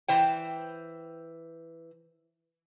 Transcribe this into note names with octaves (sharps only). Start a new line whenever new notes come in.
E3 C5 G5